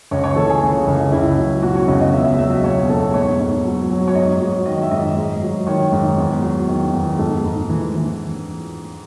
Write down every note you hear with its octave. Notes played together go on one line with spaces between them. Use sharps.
C#2 C#5
C#5
E3 A4
G#4
C#3
C#2
C#2 E4
F#3
B2 F#4
C#5
C#2 D#5
D#5
E2 E5
E5
F#3 E5
D#5
B2 C#5
E2 A4
G#2 C#5
G#2
F#3
F#3
C#5
G#2 D#5
F#3
D#3 D#5
E5
G#2 D#5
G#2
F#3
D#3 C#5
G#2
E2
F#3
D#3
E2
G#2 A4
G#2
E3
E3